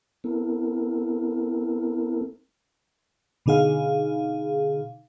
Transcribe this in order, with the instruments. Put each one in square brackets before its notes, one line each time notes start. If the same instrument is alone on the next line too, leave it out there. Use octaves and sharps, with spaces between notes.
[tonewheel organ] B3 C4 E4 A4 A#4
[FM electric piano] B2 D3 D#4 G#4 F5